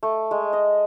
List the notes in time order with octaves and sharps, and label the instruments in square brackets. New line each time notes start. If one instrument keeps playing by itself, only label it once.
[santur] A3
G#3
D#5